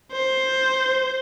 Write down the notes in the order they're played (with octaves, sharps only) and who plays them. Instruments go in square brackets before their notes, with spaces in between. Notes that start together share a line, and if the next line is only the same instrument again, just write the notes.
[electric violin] C5